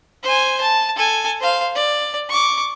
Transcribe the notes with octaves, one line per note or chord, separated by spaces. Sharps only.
C5 G#5
A5
A4 G#5
C5 F5
D5
C#6 D6